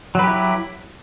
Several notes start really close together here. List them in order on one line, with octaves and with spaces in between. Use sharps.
F#3 B4 G4 E4